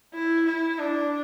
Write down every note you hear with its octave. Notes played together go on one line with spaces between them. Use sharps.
E4
E4
D4